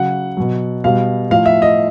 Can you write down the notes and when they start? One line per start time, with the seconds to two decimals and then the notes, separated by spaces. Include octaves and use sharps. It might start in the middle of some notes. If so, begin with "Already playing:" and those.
Already playing: C#3 F#3 F#5
0.37 B2 F#3
0.84 B2 G3 F5
1.30 A2 F3 F5
1.46 E5
1.62 D#5